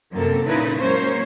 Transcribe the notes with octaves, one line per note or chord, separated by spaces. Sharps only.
F#2 C3 A#3 A4
A#2 C#3 D#4 E4 B4
F#3 G#3 A#3 C#4 C5 C#5